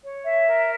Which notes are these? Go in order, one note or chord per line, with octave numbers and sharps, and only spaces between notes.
C#5
E5
A#4